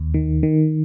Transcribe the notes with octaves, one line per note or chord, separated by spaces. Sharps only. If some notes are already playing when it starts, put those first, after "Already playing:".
Already playing: D#2
D#3
D#3